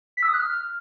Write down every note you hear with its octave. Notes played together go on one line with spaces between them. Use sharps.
B6
E6
D#6
F#6
F6